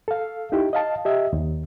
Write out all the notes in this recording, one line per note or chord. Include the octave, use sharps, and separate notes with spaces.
A4 F5
D#4 E4 G4
D#5 F5 A5
G4 D#5 E5
D#2